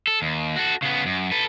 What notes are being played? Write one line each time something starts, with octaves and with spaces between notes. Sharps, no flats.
A4
D#2
F#4 A4
C#3 B3
F#2
A4 B4